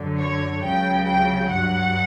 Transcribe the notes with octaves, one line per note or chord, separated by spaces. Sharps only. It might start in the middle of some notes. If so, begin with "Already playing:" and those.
Already playing: F#2 D3 F#3
C#5
C#2 C#3 F#3 G5
G5
G2 F#3 F#5